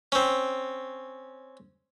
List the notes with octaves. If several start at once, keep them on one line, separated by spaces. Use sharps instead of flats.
C4 C#4